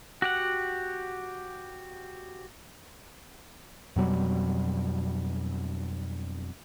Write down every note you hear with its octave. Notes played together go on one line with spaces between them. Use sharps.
F#4 G4 F#5
F2 B2 F#3 G3